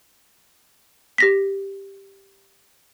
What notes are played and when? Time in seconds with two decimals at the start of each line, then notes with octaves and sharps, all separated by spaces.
1.18 G4 A#6 B6